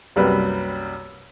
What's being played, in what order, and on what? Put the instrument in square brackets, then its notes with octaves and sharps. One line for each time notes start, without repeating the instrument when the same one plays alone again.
[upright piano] C2 F#2 G3 A#3 B4